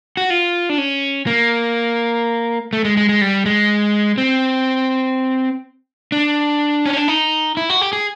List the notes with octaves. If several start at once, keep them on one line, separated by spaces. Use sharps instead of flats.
F#4
F4
D4
C#4
A#3
A3
G#3
G#3
G#3
G3
G#3
C4
D4
C#4
D4
D#4
E4
F#4
G4
G#4